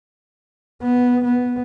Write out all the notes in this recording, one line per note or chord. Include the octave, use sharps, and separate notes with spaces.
B3
B3